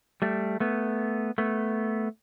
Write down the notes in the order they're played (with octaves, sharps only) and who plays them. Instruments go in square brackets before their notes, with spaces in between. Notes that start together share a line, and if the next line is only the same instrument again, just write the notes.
[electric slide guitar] G3 A3
A3 B3
A3 B3